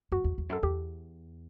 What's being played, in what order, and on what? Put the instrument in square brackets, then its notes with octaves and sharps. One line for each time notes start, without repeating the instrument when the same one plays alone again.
[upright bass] F#2 [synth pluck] F#4
[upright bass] E2
E2
[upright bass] F#2 [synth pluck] A4
[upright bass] E2 [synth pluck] G4